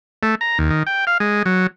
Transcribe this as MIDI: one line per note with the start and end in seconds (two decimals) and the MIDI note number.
0.23 0.35 57
0.41 0.58 82
0.59 0.70 39
0.70 0.83 51
0.87 1.05 79
1.07 1.18 77
1.20 1.43 56
1.46 1.67 54